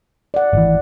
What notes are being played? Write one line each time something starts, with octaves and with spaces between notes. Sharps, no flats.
D5 F#5
G#1 E3